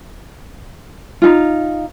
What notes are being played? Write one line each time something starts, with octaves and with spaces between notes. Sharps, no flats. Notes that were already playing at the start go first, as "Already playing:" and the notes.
D#4 F4